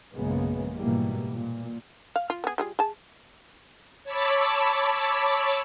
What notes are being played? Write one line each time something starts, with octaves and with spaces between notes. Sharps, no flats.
A#1 F#2 C#3 G#3 A#3 B3
G#2 B2 E3 G3 A#3
A#2
F5
F4
B3 G#4
G3 F4 G#4
G#4 A5
C#5 A5 B5 D6 E6